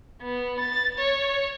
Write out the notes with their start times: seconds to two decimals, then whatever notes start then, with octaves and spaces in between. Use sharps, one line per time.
0.22 B3
0.59 A6
0.98 C#5